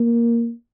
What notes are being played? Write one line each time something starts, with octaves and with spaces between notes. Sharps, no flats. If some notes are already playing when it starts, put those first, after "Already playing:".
Already playing: A#3